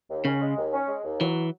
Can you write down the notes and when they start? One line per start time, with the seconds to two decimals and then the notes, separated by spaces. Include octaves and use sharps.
0.09 D#2
0.25 C#3 C#4
0.41 G#3
0.57 D#2
0.73 C#4
0.88 G#3
1.04 D#2
1.20 E3 F#3